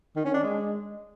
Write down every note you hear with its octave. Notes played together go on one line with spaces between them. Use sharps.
D#3
C#4
D4
G#3